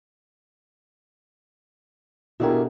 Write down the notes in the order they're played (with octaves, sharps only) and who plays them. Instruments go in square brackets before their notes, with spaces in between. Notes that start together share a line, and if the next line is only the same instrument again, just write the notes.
[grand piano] B2 D4 G4 [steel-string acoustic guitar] E4 G#4 A#4